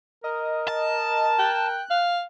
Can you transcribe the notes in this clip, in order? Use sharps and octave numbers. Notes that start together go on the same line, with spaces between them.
A#4 D#5
A5
G5 F#6
F5